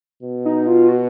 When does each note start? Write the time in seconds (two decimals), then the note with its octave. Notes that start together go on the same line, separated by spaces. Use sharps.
0.23 B2
0.46 D#4
0.67 F4
0.89 F#4